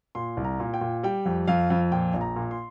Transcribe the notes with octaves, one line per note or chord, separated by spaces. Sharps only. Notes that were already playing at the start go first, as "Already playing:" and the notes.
A#2 C6
C2
A#5
A#2
G5
A#2
G3 G5
F2
F2 F5
F2
A#2 G5
A#1
A#5
A#2
C6